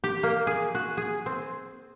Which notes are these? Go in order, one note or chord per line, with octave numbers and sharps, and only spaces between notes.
G4
A#3
G#4
F#4
G#4
C4